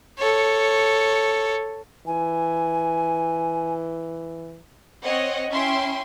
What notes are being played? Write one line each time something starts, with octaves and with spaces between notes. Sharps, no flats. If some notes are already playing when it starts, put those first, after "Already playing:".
A4 C#5
E3 G#5
C4 C#5 D#5 F#5
C#4 E4 E5 G5 C6